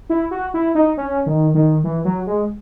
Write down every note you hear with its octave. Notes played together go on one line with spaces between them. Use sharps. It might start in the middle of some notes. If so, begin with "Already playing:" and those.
E4
F#4
E4
D#4
C#4
D#3
D#3
E3
F#3
G#3